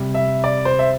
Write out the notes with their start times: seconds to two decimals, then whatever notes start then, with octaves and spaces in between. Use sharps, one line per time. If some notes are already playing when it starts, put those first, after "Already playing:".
Already playing: C3 G3
0.14 E5
0.44 D5
0.65 C5
0.79 E5